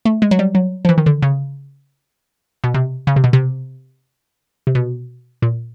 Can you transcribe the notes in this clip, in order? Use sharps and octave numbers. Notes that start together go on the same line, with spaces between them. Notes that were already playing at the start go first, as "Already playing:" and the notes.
A3
G#3
F#3
G3
F#3
F3
E3
D#3
D3
C#3
B2
C3
C#3
C3
B2
C3
C3
B2
A#2